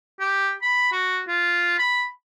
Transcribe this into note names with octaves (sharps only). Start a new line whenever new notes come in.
G4
B5
F#4
F4
B5